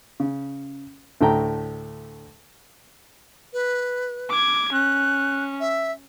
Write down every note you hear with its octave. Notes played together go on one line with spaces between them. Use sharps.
C#3
D2 A2 A3 G5 A#5
B4
D6 G#6
C#4 F#6
E5